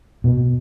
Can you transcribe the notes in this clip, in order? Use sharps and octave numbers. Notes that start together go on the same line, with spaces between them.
B2